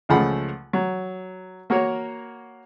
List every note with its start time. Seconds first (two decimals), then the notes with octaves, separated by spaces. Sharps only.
0.09 C#2 C#3 F3 A3 F#5 B5
0.73 F#3
1.70 A#3 F#4 A#4 C#5